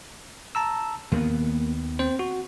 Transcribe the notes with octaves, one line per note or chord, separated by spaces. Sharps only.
A5 A#5 E6
D#2 D#3 A#3 B3
C4 C5
F#4